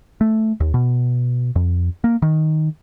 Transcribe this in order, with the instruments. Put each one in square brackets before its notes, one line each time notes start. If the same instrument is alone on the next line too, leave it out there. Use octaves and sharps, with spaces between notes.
[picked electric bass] A3
D#2
B2
F2
A#3
D#3